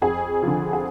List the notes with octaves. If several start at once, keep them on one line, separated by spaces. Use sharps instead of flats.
F2 G#4
D3 F3
G#4